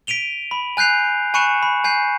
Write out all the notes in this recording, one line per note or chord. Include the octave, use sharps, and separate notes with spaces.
B6 D7 D#7 F7 G7
B5
G#5 F#6 G6 C7 F7
G#5 B5 C#6 F#6 C#7 E7
B5
G#5 G6 C7